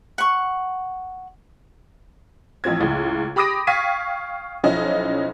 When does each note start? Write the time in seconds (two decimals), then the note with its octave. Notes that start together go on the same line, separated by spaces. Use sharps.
0.18 F#5 C#6
2.64 A1 F3 C4 G#6
2.80 C#2 A2
3.36 G4 B5 D6 D#6 A#6 D7
3.67 F5 G5 C#6 G#6 B6 D#7
4.64 B1 F3 C#4 E4 D#5